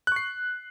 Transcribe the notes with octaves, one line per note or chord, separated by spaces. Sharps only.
C#6 F#6 C7